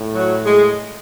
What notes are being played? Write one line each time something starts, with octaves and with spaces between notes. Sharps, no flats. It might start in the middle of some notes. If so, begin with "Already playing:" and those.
Already playing: A2
F#3
G#3